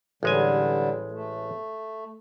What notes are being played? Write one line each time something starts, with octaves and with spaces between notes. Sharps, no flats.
A1 D3 G3 G#3 G#5
A3